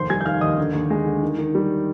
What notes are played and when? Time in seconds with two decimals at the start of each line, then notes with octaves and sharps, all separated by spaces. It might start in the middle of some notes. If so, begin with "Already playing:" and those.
Already playing: F1 D#2 C5 C6
0.09 G3 G#5 G#6
0.21 G6
0.25 D#3 F5 F6
0.41 D#2 D#5 D#6
0.58 D3
0.73 D#2
0.90 G#3
1.06 D3
1.23 D#3
1.38 D#3
1.55 G3